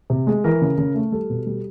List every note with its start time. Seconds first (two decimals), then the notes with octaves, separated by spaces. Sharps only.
0.10 C3
0.27 G#3
0.44 E3 A#4
0.62 C#3
0.78 C#3
0.94 A3
1.12 G3 A4
1.30 B2
1.46 G3